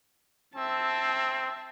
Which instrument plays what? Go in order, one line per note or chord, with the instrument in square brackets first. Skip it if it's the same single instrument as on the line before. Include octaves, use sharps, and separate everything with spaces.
[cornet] C4 [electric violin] E5 A5